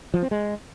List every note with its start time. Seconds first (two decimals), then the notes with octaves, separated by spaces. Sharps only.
0.14 F3
0.22 C4
0.31 G#3